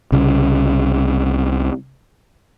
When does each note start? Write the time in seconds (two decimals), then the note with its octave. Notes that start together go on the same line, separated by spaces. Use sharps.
0.12 C2 C#3